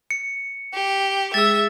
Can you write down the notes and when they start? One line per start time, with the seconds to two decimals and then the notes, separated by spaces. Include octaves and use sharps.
0.11 C#7
0.73 G4
1.34 G#3 G#4 E5 E6 A6